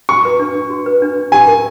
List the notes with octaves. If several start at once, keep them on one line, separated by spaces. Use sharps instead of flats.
F#4 C#6
B4
D4
D4
F#4
B4
D4
D4
G4 G#5
A#4